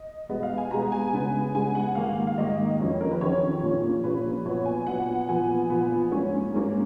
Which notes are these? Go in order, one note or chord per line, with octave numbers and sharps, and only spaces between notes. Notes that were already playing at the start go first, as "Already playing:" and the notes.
Already playing: D#5
B2 G#3 B3 D#5
F5
G#5
B2 G#3 B3 A#5
G#5
C#3 G#3 B3
C#3 G#3 B3 G#5
F#5
G#2 D#3 A#3 F5
F5
G#2 D#3 A#3 D#5
F2 D#3 F#3 C#4
A#4
B4
F2 D#3 F#3 C#4 C#5
A#2 F3 A#3 C#4
A#2 F3 A#3 C#4 B4
A#2 F#3 B3 C#5
G#5
A#2 F#3 B3 F#5
A#2 F3 B3 G#5
A#2 F3 B3
G#2 F#3 A#3 C#4
G#2 F#3 A#3 C#4